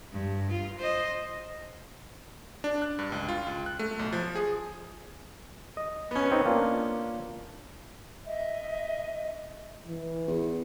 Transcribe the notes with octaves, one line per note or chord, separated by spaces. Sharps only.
G2
F4
C5 D#5
D4
F#6
G2
C#2
F4
C#2
F#6
A3
B1
F3
G#4
D#5
B3 C#4
C4 D#4
A#3 D4 F4
D#5 E5
E3
E2